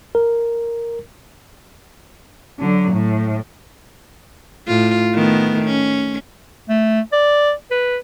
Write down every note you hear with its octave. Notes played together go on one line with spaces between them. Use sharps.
A#4
D3 F#3
A2
A2 F4
D#3 A3 B3
C#4
A3
D5
B4